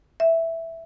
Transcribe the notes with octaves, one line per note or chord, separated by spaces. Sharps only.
E5